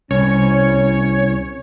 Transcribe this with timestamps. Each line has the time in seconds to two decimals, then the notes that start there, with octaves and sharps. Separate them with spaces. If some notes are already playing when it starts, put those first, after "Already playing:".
0.11 C2 C#4 C#5